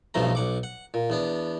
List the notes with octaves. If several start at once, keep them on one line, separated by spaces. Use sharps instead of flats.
B1 G2 B2 F3 A3 A#5
B1 F#5 D6
F#5
A#2
E2 B3 D4